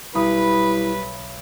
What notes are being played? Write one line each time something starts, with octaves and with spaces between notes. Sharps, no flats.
B1 G3 E4 B4 B5 D#6